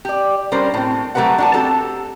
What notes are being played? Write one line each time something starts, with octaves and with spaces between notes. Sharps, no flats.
G4 D5
G3 C#4 D4 A#4 C5
A2 C4
F#3 A3 G4 A#4 B4 F#5
D4 F#4 A5
C4 G4 A4 A5 A#5